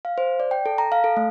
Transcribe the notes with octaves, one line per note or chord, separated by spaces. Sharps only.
F5
C5
D5
G5
A4
A#5
F5
A4
A3